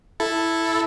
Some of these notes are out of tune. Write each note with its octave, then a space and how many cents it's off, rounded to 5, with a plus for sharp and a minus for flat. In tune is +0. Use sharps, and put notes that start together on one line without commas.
E4 +0 A4 +0